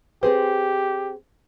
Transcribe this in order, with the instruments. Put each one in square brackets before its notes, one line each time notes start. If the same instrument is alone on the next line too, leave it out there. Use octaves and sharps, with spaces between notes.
[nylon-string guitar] C4 G#4 C5 [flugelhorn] G4 [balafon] B4